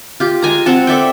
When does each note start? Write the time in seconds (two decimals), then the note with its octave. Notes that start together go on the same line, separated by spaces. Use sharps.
0.20 F4 G4
0.42 G#3 G#5 A#5
0.66 C4 F#5 A5
0.87 A4 D5 E5 G5